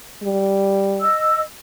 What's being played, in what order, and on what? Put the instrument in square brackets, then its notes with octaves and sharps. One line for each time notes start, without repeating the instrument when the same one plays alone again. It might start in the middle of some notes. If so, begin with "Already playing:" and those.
[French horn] G3
[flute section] D#5 E6